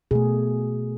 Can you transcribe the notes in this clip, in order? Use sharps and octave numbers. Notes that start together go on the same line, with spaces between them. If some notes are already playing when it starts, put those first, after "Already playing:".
B2 A3 G#4